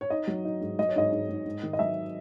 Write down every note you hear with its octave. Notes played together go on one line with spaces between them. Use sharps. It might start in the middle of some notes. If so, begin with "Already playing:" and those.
C#5
D#4 D#5
F#3
D#4
G#2
F#3 D#5
C#5
G#2 D#5
G#2
G#2
G#2
D#3
D#5
F#3 E5